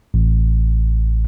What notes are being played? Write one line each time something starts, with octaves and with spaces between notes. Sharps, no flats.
A1